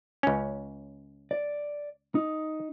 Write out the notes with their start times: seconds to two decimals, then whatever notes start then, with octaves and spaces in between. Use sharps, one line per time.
0.23 C#2 C#4
1.31 D5
2.15 D#4